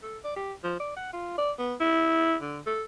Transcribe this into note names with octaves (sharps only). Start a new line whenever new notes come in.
A4
D5
G4
F3
D5
F#5
F4
D5
B3
E4
D3
A4